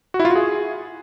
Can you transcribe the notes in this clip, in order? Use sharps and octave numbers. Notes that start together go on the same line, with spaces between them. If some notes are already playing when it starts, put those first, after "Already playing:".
F#4
E4
F4
F#4
G#4